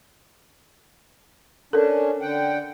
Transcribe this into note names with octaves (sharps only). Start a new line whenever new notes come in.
C#4 D4 A4 A#4
D3 F#5 G5